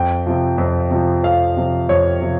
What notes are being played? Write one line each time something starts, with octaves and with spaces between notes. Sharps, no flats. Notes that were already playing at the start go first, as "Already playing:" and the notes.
Already playing: F2 G5
C3 F3
F2
C3 F3
F2 F5
C3 F3
F2 C#5
C3 F3